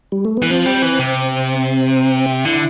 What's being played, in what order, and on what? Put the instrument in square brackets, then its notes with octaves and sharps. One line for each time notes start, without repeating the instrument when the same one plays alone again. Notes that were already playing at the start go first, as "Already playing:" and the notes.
[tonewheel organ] G3
A3
B3
[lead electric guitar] E3
[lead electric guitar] F3 [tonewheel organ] C4
[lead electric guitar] G3
E3
C3
[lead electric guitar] D3 [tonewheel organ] E4